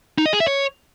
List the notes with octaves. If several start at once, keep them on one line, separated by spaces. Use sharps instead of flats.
D#4
D#5
G#4
E5
C#5